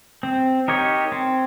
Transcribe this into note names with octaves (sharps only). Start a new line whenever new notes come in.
C4
D#4 G4 A#4 C#5
C4